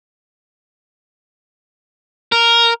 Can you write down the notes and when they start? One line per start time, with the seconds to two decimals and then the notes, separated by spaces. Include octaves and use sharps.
2.32 A#4